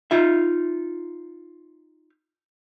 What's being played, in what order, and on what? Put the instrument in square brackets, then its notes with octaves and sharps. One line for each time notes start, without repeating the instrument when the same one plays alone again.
[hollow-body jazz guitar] D#4 F4 E5